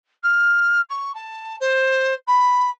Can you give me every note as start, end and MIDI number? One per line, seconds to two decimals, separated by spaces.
0.23 0.81 89
0.89 1.11 85
1.14 1.56 81
1.60 2.14 72
2.27 2.70 83